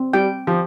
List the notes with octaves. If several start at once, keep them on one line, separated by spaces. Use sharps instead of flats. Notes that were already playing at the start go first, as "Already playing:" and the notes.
Already playing: C4
G3 G5
F3 G4